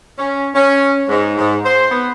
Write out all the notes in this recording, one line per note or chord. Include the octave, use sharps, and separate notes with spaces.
C#4
C#4
G#2
G#2
C5
B3